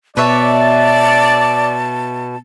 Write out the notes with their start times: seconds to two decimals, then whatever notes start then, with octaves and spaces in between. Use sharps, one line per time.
0.17 B2 B4 C#5 D5 E5 A5